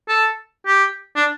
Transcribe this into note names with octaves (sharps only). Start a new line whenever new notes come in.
A4
G4
D4